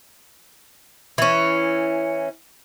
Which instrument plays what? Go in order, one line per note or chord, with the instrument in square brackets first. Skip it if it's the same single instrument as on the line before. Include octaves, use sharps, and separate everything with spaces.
[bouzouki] E3 C#4